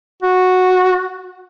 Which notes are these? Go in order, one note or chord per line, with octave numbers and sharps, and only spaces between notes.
F#4